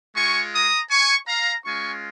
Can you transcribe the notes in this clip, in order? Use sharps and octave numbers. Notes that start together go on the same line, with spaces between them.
G#3 F4 G#5 C#6
A#5 D#6
G#5 C#6
F5 A#5
G#3 C#4 F4 G#5 C#6